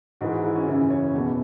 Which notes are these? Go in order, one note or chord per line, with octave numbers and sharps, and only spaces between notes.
G#2 E3 F#4
F#4
E4
C#4
F#2 C#3 E3 C#4
C#5
E2 B2